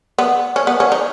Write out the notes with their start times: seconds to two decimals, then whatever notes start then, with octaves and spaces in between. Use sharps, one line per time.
0.19 B3
0.56 C#4
0.67 B3
0.80 C#4
0.92 D#4